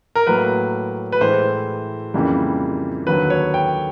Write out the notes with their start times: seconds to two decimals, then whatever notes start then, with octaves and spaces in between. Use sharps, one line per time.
0.15 A#4
0.27 A2 F#3 A#3 B4
1.12 B4
1.21 A2 E3 G#3 C5
2.14 F2 C#3 E3 G3 A#3
3.07 D#2 D3 F#3 B4
3.30 C#5
3.54 G5